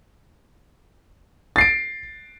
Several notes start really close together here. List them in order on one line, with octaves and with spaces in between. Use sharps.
A6 C7 D7